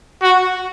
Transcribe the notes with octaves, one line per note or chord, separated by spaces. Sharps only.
F#4